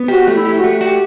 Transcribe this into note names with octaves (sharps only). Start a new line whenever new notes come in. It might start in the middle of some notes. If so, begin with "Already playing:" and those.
Already playing: B3
F#4 G4
A3
E4
G4
F#4
A3
F#4 G4